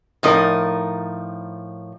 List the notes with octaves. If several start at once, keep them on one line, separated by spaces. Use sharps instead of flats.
A2 F3 D#4 A#4